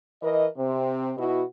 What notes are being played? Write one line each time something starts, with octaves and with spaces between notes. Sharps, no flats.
E3 A#4 D#5
C3 C4
B2 E4 F#4